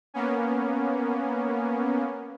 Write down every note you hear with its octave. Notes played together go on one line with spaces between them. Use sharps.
A#3 B3 C#4